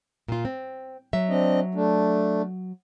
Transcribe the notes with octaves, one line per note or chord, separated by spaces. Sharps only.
A#2 F4
C4
F#3 E5
C4 D4 D#5
A3 D4